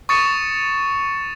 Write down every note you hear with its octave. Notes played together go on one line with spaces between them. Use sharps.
C#6 D#6 A6 C#7 E7